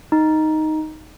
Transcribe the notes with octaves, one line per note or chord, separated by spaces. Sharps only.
D#4